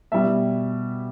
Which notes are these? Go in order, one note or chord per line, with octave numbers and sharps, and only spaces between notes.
B2 G3 E5